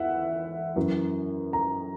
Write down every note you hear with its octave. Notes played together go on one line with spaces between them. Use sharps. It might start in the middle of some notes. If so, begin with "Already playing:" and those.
Already playing: E2 E5 F#5
F#2 E3
A#5